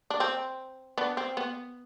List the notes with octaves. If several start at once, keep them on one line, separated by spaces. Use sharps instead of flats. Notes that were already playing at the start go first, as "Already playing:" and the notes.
D4
C4
B3 D4
C4
B3